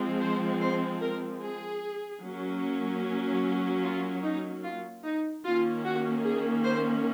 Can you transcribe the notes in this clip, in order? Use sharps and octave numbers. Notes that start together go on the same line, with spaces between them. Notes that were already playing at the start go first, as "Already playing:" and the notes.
Already playing: F3 G#3 C4
C5
C5
A#4
G#4
F#3 A#3 C#4
F4
D#4
F4
D#4
D#3 A#3 C#4 F4
F#4
G#4
C5